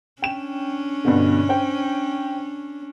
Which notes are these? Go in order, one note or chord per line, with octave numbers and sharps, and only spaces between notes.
C#4 D4 G5 E7
G2 B2 D3
C5 G5